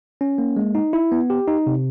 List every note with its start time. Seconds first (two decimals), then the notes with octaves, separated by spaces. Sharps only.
0.21 C#4
0.38 A#3
0.57 G#3
0.75 D#4
0.93 E4
1.12 B3
1.30 G4
1.48 D#4
1.67 C3